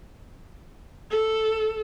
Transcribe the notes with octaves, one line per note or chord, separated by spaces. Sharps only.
A4